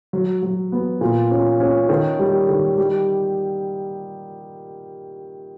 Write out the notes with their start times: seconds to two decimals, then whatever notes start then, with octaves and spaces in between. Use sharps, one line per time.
0.13 F#3
0.42 F#3
0.72 B3
1.01 A#2
1.31 C#4
1.60 C#4
1.89 D#3
2.19 G3
2.49 D#3
2.78 G3